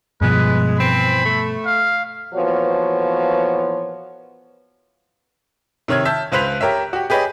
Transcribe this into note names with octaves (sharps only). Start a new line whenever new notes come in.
G2 B2 F3 G#3 B4
E3 C4 B5
A3
F5
A#2 E3 F3 B3 F#4 C#5
C3 D#3 C#5 F6 G#6
E5 A5 G6
C#2 B4 C5 F#6 B6 F7
G4 A#4 C#5 E5
F#4 G4
G4 G#4 B4 C#5 D#5